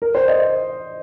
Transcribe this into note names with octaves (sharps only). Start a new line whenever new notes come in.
A#4
C5
D#5